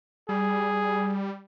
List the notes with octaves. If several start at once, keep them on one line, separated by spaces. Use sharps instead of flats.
G3 G#4